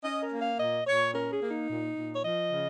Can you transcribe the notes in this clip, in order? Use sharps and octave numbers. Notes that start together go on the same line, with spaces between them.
C#4 D#5
A#4
A#3
F5
A#2 D#5
A#2 C#5
C#4 A#4
G#4
A#3
D#4
A#2
A#2
C#5
F3 D#5
C#3